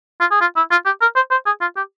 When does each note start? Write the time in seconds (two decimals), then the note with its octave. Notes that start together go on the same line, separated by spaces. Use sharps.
0.21 F4
0.31 G#4
0.41 F4
0.56 E4
0.71 F4
0.86 G4
1.01 A#4
1.16 C5
1.31 C5
1.46 G#4
1.61 F4
1.77 G4